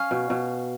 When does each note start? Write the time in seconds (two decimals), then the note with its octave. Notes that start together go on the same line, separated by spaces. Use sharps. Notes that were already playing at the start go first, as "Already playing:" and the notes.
Already playing: C#4 F5
0.11 B2
0.30 B2